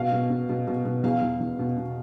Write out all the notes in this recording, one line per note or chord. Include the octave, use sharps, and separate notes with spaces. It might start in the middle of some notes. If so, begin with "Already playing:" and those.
Already playing: B2 F5
B2
B2
B2
B2
B2
E2 F5
E2
E2
B2
B2